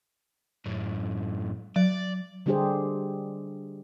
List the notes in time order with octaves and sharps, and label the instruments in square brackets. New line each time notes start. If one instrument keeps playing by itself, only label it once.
[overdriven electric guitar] F#2 A2
[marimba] F#3 [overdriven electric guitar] D5
[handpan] D3 G3 D4 G4 G#4 C5